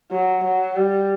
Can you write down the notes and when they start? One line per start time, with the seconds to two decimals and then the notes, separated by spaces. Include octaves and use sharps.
0.11 F#3
0.44 F#3
0.77 G3